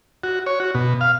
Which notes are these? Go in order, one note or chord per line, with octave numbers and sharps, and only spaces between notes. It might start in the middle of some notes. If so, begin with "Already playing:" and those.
F#4
C#5
F#4
B2
F5